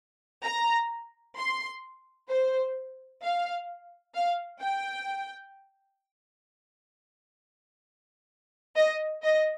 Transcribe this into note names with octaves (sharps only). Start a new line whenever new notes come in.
A#5
C6
C5
F5
F5
G5
D#5
D#5